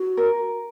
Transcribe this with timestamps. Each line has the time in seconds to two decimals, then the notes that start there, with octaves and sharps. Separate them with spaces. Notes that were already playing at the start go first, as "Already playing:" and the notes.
Already playing: F#4
0.17 A#4